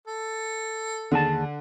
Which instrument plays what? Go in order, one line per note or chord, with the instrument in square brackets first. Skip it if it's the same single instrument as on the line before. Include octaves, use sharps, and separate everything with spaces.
[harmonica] A4
[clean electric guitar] D#2 G#4 A5 [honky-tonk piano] D3